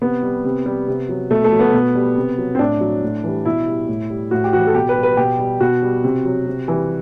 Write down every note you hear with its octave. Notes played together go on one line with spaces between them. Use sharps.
C3 B3
G3
C3
G3
C3
F#3
B2 A3
A3
F#3
B3
B2
G3
C3
F#3
C4
A2 D4
F#3
A2
E3 G3
B2 E4
G3
A2
G3
A2 F#4
G4
E3 G3 F#4
A4
B2 G4
B4
G3
B4
B2 G4
G3
B2 F#4
G3
C3
F#3
C3
E3 G3